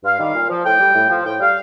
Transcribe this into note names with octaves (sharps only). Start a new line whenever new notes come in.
G2 F5
D#3 G3 F5
A#2
F3
A2 G5
G3
A2
F3
A2 G5
G3 F5